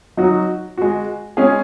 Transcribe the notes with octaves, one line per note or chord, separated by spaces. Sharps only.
F#3 D#4 F#4
G#3 F#4
G#3 C#4 G#4